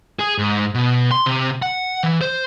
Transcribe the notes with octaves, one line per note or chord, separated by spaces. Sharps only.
G#4
G#2
B2
C6
C3
F#5
E3
C5